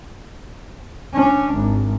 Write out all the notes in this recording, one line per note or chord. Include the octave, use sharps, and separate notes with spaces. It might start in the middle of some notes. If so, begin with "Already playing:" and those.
C#4 D4
G#1